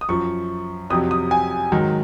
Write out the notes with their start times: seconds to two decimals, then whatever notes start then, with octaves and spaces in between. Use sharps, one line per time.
0.01 D#6
0.09 F#2 F3 C#6
0.90 F2 C3 F#3 D#6
1.11 D#6
1.31 G#5
1.72 G#2 D#3 F#3